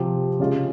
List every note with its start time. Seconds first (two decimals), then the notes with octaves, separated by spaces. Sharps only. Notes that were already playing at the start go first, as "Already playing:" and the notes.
Already playing: C3 F3 C4 G4
0.39 C#3 G#3 C#4 F4